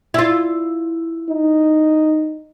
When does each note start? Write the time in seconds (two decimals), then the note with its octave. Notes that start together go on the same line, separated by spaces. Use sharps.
0.14 E4 F4
1.31 D#4